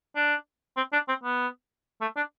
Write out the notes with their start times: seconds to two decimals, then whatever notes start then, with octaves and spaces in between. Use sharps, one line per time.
0.16 D4
0.77 C4
0.93 D4
1.08 C4
1.24 B3
2.01 A3
2.16 D4